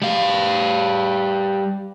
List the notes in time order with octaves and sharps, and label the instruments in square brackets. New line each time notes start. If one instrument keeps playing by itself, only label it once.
[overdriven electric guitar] G3 F5